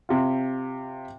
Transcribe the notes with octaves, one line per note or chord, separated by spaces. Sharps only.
C3 F4